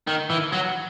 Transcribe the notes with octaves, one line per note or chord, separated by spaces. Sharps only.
D#3
E3
F#3